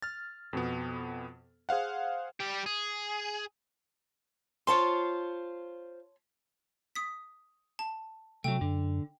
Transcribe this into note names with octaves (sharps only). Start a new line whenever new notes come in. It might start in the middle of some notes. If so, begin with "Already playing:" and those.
F6 A6
F2 B2 B3
G#4 C5 F5 F#5
G3 G4
G#4
F4 C5 C#5 F5 A5 C6
D#6 B6
A5
C3 F#3 A3 G5
F#2 D3